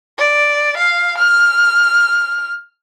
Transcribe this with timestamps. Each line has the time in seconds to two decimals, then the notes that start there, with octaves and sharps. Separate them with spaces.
0.18 D5
0.77 F5
1.18 F6